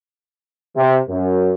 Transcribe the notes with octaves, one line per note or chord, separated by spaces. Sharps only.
C3
F#2